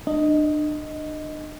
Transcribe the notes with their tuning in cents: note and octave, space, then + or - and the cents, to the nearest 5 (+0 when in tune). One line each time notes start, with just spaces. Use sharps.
D4 +35 D#5 +5